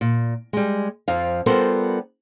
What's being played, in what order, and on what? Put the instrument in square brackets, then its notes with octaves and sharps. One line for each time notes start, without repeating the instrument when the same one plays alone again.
[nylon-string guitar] A#2
G3 G#3
F2 F3 F5
G3 B3 F4 A4 A#4 C5